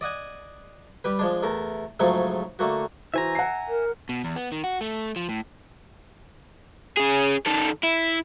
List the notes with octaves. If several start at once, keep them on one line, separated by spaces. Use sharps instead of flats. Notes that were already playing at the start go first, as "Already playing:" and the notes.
D5 D#5 F#5 G#5
G3 G4 B4
F3 G#3 D4
E2 A3 A#4
G#2 C#3 F3 F#3 A3
D3 A3 A#3 F#4
E3 F#4 C5 E5 G#5 A#5
F#5 C7
A#4
B2
E2
B3
D#3
F#4
A3
F3
A2
C#4 G#4
D#3 A4
E4